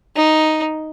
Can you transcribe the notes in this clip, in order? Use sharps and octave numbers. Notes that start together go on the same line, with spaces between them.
D#4